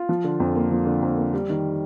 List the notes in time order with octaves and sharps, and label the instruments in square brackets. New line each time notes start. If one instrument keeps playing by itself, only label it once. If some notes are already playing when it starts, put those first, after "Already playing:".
Already playing: [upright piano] F4
F3
D3
F2
A#3
F3
D3
F2
A#3
G3
D#3